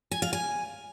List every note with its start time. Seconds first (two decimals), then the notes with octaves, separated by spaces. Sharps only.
0.11 G#5
0.22 F5
0.33 G#5